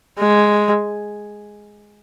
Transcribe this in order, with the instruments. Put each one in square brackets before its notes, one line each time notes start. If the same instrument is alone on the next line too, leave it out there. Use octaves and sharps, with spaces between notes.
[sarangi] G#3